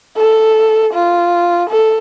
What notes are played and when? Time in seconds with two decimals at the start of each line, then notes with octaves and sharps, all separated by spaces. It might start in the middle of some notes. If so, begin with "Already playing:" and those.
0.17 A4
0.94 F4
1.70 A4